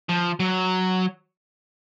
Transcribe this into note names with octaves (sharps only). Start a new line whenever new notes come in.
F3
F#3